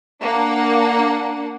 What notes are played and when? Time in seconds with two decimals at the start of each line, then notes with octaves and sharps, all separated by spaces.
0.21 A#3 D4 F#5